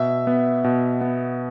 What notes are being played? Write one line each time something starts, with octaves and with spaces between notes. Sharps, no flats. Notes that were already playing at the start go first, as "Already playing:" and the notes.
Already playing: B2 E5
B3
B2
B3